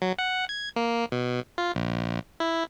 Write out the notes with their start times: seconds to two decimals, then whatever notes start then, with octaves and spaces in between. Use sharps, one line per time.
0.02 F#3
0.18 F#5
0.49 G#6
0.76 A#3
1.12 B2
1.58 F4
1.75 A#1
2.40 E4